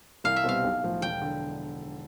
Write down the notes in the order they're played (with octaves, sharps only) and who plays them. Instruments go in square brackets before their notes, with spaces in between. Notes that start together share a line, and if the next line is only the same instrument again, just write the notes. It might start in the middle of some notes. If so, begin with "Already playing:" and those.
[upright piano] C2 [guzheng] F5
[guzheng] E5
[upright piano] B2 G3 C4 G4 [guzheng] F5
[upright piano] B1
A2 F3
[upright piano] E1 [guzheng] G5
[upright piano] D3